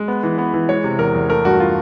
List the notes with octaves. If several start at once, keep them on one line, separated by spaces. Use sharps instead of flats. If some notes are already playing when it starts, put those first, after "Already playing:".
Already playing: G#3
B3
E3
B3
E3
G#3 C#5
C3
E2 A#4
E2
A3 A#4
G2 F#4
F4